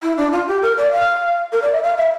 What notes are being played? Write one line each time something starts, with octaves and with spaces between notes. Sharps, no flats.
E4
D4
F4
G4
A#4
D5
F5
A#4
D5
E5
F5
E5